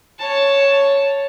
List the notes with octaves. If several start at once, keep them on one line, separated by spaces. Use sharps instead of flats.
C#5 A5